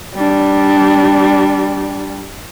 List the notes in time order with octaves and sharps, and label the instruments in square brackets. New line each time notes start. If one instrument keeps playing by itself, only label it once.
[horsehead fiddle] G3 D4